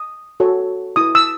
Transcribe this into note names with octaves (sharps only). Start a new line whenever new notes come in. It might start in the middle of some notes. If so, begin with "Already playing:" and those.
Already playing: D#6
F#4 A4 C#5
E4 B4 D#6
E6